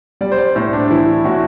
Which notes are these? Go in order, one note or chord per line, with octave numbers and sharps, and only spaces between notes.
G3 D5
C5
D5
A2 C5
D4
E3 E4
A2 F#4